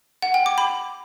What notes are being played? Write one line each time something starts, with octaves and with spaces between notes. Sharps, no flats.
F#5
G5
D6
B5